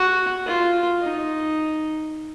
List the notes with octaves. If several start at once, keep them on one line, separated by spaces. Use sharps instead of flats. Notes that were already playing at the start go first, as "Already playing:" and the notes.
Already playing: F#4
F4
D#4